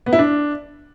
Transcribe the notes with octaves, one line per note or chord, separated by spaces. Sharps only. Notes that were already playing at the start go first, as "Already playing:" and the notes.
B3
E4
D4